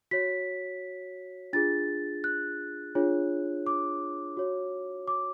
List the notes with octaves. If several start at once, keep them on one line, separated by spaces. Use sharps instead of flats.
F#4 C#5 B6
D4 F4 G#4 A6
F#6
D4 F4 G#4 C#5
D6
F#4 C#5
D6